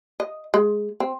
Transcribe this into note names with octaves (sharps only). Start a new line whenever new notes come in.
D#5
G#3
C4